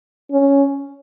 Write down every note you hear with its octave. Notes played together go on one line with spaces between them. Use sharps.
C#4